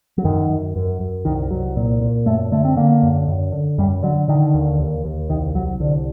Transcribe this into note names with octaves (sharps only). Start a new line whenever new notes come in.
F#3
F#2 D#3
F#2
F#2
F#2
C2 D#3
C2 F#3
A#2
A#2
F#2 A3
D3 A3
C4
D3 A#3
F#2
F#2
D3
F#2 G3
D3 F#3
D3 D#3
D#2
D#2
D#2
C2 D#3
C2 F#3
C2 D3